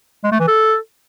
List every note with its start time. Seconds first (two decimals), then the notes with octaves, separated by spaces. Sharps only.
0.24 G#3
0.32 A3
0.40 E3
0.48 A4